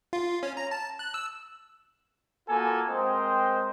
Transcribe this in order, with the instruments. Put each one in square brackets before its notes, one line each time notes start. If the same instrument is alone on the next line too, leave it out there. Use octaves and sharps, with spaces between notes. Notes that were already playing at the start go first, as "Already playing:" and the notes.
[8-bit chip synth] F4
C#4
A#5
A5
F#6
E6
[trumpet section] A#3 F4 F#4 A4 G#5
G#3 C4 A#4 C5 D#5 G5